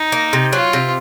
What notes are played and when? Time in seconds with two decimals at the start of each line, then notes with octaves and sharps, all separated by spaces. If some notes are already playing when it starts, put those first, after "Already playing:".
Already playing: D#4
0.12 A#3
0.33 C3
0.53 F#3 F4
0.73 C3